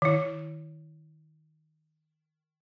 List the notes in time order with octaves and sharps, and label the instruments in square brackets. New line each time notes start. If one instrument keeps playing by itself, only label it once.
[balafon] D#3 E4